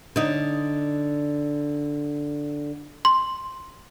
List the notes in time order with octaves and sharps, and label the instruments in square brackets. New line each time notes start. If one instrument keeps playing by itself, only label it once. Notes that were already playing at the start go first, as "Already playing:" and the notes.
[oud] D3 D#4
[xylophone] C6